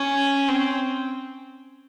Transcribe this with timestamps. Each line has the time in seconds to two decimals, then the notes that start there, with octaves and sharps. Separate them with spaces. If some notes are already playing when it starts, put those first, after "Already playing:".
Already playing: C#4
0.49 C4